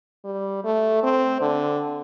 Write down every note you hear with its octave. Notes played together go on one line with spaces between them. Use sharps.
G3
A3
C4
D3